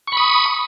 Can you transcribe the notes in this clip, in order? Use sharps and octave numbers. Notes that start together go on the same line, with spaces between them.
B5 C#6 D#6